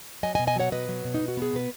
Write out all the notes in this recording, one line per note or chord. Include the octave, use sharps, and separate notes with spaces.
F#3 D#5 G#5
D#5 G#5
B2
D#5 G#5
F#3 C#5 F#5
B2 B4 D#5
F#3
B2
D#4
B2
F#4
B3 G#4
B2 B4